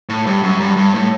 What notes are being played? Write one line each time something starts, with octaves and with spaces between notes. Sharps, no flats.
A2
G2
F#2
G2
G2
A2